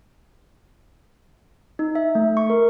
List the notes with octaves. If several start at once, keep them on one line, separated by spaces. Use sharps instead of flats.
D#4
E5
A3
C#6
A#4